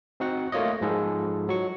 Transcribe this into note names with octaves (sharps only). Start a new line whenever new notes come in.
C4 D#4 F#4 F#5
A3 A#3 F4 C#5 D#5
G#2 F3 G#3 D#4 A4
F#3 C#6